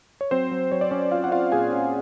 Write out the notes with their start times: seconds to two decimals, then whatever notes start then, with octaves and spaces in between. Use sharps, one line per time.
0.21 C#5
0.31 F#3 C4 C5
0.51 F#3
0.72 F#3 C#5
0.81 D5
0.91 F#3 C#4 C#5
1.12 C#4 F4 F5
1.24 F#5
1.32 C#4 F4 F5
1.52 A#2 G#4 G#5
1.72 C#4